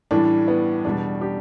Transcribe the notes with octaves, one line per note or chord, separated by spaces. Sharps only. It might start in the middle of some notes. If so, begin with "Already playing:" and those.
A2 E3 G3 D4
B3
E2 B2 G3 D4
D4 G4